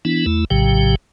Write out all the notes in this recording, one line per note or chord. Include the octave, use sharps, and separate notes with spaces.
E3 B3 D4 E4
E2 A3 E4
A#1 A2 C#3 F#3 G4 G5